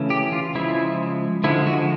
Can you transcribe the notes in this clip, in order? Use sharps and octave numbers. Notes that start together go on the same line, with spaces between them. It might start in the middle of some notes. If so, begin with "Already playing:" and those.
Already playing: C#3 E3 A3 C#4
G4
F4
C#3 F3 G#3 E4
D3 F3 G#3 E4
F#4